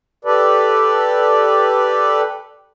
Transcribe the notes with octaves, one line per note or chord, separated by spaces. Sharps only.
G4 A4 B4 D5